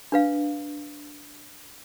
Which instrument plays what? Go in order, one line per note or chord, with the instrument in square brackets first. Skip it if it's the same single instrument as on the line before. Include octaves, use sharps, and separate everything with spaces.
[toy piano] D4 B4 F5